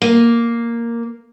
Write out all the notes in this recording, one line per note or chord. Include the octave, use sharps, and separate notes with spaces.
A#3